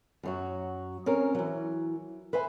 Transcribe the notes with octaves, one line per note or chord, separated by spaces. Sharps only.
F#2 F#3 F#4
C4 C#4 G#4 A#4
E3 F#3
B4 C5 E5 G#5